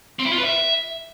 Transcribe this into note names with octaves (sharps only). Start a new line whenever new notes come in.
C4
E4
F4
B4
E5